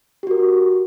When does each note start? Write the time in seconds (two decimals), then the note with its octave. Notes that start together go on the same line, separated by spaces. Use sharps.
0.23 G4
0.27 F#4
0.31 A#4